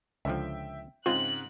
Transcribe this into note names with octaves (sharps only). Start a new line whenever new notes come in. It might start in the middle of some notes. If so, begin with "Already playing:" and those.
C#2 D3 F3 E5 G5
G#2 C#3 G#3 C4 F4 F#6